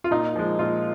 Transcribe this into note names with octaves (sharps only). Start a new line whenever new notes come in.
F4
A#2 D#4
F3 G#3
A#2 F4